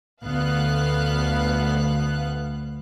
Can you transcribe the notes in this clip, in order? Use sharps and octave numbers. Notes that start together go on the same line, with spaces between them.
D2 B3 F5 F#6